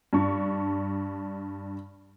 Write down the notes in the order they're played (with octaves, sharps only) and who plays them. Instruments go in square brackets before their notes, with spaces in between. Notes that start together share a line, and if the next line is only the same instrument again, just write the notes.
[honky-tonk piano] G2 D4 C#6